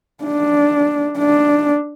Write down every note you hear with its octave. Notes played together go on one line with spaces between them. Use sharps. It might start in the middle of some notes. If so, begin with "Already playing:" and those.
D4
D4